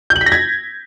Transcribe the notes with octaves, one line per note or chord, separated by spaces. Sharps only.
G6
F#7
B6
A#6
G#6